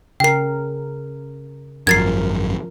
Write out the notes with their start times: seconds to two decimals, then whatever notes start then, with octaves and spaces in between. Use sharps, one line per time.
0.20 C#3 A#4 G5 C7
1.87 G#1 F#2 F3 A#4 G#6 A6 C7